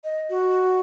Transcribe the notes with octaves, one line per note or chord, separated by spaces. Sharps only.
D#5
F#4